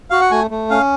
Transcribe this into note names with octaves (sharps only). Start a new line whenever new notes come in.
F#4 F5
F#5
A3 G#5
A3
C#4 F5